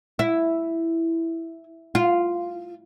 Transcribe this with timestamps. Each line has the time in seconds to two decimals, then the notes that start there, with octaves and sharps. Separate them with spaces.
0.19 E4
1.95 F4